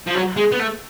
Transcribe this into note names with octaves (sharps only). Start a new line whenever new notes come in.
F3
F#3
G#3
B3
A3